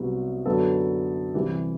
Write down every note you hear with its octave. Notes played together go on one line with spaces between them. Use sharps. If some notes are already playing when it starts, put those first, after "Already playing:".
Already playing: C2 C3 F#3 B3
F#2 D3 F#3 B3 A4
C2 C3 E3 G4